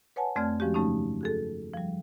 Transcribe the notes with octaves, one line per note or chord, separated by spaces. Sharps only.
B4 C#5 F#5 G#5 A5
F2 A3 C4 D5 F6 G#6
D#3 F3 G#3 C#4 F#4 G4
G2 C#3 F#3 A3 C#4 D#4
F#4 G#4 A4
F3 G3